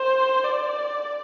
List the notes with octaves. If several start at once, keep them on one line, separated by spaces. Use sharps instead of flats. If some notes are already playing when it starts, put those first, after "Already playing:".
Already playing: C5
D5